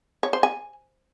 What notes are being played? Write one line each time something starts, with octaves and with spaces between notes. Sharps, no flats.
C#5
C5
G#5